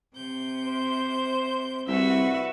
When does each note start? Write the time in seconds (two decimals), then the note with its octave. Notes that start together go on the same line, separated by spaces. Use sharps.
0.15 C3 G6
0.66 C5
1.88 C2 F#4 B4 E5